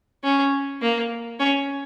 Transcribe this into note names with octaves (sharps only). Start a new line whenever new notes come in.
C#4
A#3
C#4